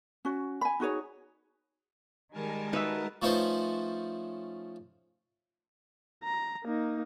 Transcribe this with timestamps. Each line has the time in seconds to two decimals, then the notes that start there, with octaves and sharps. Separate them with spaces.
0.25 C#4 F#4
0.61 G#5 B5
0.80 D#4 F#4 G#4 C#5
2.33 D#3 G3 G#3 A#4 G#5 A5
2.73 D#4 F#4 B4 E5
3.22 F3 A3 C#4 D#4 B4 C5
6.24 A#5
6.65 A#3 D#4